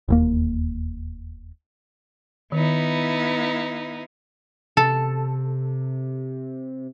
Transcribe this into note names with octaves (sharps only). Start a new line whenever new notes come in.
E1 D#2 A#3
D#3 B3 D#4 E4
C3 A4